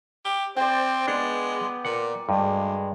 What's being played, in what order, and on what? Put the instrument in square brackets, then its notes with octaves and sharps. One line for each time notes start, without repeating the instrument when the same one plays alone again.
[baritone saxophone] G4
[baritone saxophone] C4 [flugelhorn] C5 [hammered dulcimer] D5 G5
[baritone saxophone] G#3 [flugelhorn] B3 [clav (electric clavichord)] D4
[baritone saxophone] A#2 [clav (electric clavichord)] F#5
[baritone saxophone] D2 [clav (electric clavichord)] G2 [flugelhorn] G#3